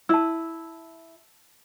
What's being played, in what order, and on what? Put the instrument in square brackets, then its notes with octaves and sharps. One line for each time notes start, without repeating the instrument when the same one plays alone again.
[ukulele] E4 [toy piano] A5 E6